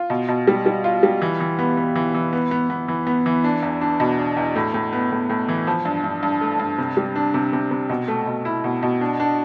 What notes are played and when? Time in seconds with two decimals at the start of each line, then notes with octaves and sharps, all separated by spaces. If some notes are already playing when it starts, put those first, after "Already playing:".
Already playing: F4
0.10 B2
0.29 B2
0.47 G3
0.66 G3
0.84 F4
1.03 G3
1.22 E3
1.40 E3
1.59 B3
1.77 B3
1.95 E3
2.14 E3
2.33 B3
2.51 B3
2.70 B3
2.88 E3
3.07 B3
3.26 E3
3.44 D4
3.63 E2
3.81 D4
4.00 B2
4.19 D4
4.37 E2
4.55 A2
4.74 A2
4.93 B3
5.12 A2
5.29 A2
5.48 E3
5.67 F3
5.85 G2
6.04 G2
6.23 G2
6.41 A3
6.59 G2
6.78 C3
6.97 G3
7.16 D4
7.34 C3
7.53 C3
7.71 C3
7.90 B2
8.08 A3
8.27 B2
8.45 E4
8.64 B2
8.83 B2
9.01 D4
9.20 D4